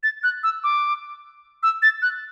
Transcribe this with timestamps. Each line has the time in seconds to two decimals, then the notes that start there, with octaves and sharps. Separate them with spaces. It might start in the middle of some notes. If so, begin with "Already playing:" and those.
0.03 A6
0.23 F#6
0.43 E6
0.64 D6
1.63 E6
1.82 A6
2.02 F#6